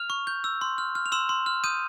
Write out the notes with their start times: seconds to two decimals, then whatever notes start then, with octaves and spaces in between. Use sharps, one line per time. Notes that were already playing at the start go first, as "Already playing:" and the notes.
Already playing: F6 F7
0.10 C#6
0.27 G6
0.44 E6
0.61 C6
0.78 F6
0.95 F6
1.06 F7
1.12 C6 E6 E7
1.29 C6
1.46 F6
1.64 D#6 G6 D#7